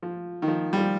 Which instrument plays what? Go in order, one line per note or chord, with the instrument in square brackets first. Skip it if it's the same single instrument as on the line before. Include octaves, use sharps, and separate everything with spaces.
[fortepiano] F3
D#3
F3
G3
F3